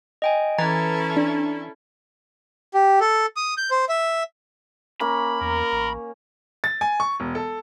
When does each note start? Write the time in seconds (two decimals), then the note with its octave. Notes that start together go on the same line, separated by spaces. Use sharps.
0.22 D#5 G5 G#5
0.58 E3 C#4 E4 A4 A#5 G#6 A6
1.17 D4
2.74 G4
3.00 A4
3.36 D#6
3.57 G6
3.71 C5
3.89 E5
5.00 A#3 C#4 B5
5.41 E2 A#4
5.72 A1
6.64 A6
6.81 G#5
7.00 C#6
7.20 E1
7.35 A4